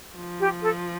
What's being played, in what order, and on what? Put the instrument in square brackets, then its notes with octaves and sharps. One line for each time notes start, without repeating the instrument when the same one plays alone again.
[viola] F3
[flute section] G4
A4